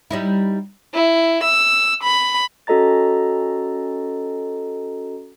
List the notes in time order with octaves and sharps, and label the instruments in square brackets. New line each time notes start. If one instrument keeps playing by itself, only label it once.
[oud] G3 D#4 E4
[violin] E4
E6
B5
[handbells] C#4 F#4 A4 D#5 A#5 A6